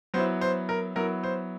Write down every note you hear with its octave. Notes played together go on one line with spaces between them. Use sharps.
F#3 B3 E4 C5
C5
A#4
F#3 B3 E4 A#4
C5